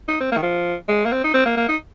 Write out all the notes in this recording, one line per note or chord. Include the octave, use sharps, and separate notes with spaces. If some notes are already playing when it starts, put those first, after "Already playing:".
D#4
C4
A#3
D#3
F3
G#3
A#3
C4
D#4
C4
A#3
A#3
D#4